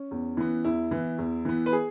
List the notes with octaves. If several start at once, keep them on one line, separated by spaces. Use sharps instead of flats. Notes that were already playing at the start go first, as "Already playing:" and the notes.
Already playing: C#4
E2
E3 B3
E2 E4
E3 B3
E2
E3 B3
B4
G#4